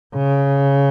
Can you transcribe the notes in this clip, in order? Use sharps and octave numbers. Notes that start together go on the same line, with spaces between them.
C#3